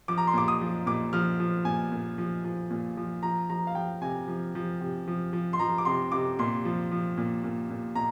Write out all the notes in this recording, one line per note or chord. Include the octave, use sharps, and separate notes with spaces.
F3 D6
A#5
C6
A#2 D6
D#6
F3
A#2 D6
F3 F6
F3
A#2 G#5
A#2
F3
F3
A#2
F3
F3 A#5
F3 A#5
F5
F3 G5
C3 G#5
F3
F3
C3
F3
F3
C6
F3 A#5
D6
C3 C6
C3 D6
A#2 C6
F3
F3
A#2
A#2
A#2
A#2 A#5